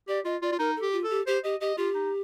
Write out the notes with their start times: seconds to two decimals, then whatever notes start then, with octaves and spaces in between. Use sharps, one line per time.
0.08 G4 D5
0.25 F4 D#5
0.42 F4 D5
0.52 F4
0.59 D#4 A#4
0.76 A4
0.82 G4
0.93 F4
1.04 A4
1.10 G4
1.27 G4 C5
1.44 G4 D#5
1.61 G4 D#5
1.77 F4 G4
1.95 D#4